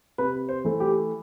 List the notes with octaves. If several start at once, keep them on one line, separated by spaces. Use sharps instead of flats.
C3 B4
C5
E3 A3
G4